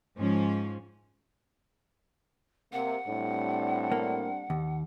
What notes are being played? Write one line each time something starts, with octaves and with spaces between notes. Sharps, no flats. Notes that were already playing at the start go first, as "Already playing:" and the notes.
G#2 F3 C#4
C3 A#3 F#5
A2 G3 C4 D4
A#3
D#2